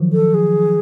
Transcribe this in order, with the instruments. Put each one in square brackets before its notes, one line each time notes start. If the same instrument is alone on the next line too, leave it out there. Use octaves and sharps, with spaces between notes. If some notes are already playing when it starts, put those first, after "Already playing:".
Already playing: [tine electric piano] D#3 F3 F#3
[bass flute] A4
G#4